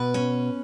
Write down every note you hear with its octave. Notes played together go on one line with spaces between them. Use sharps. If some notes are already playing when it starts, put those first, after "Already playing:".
Already playing: B2 B4
C#4